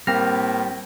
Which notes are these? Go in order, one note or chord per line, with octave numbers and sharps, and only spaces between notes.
A2 G3 A#3 C4 G5 F6 A#6